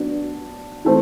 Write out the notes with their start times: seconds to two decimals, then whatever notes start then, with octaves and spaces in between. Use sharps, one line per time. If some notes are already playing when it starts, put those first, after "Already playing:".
Already playing: F#3 B3 D4
0.85 E3 A3 C4